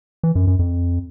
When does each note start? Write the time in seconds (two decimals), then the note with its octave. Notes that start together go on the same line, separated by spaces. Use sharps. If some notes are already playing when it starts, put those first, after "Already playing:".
0.23 E3
0.35 F#2
0.47 F#2
0.59 F2